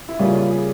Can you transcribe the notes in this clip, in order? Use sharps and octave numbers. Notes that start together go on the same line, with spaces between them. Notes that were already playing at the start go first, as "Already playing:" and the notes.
E4
C#3 G3 A#3 C#4 F4
F4
G#4